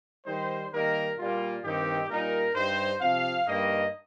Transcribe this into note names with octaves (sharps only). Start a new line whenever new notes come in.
D#3 G3 D#4 C5
D#3 G3 A#3 D#4 A#4
A#2 G3 A#3 F4
G2 D#3 C4 D#4 G4
A#2 G3 D#4 A#4
G2 G3 D#4 C5
C3 F3 C4 F5
G2 G3 A#3 D#4 D#5